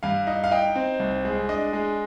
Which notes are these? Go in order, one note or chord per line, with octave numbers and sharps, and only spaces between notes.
G2 F5
D#4
F5
D#4 G5
C4
C2
G#3
D4 D#5
G#3